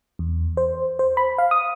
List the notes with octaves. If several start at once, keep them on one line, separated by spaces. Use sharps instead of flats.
E2
C5
C5
B5
F5
D#6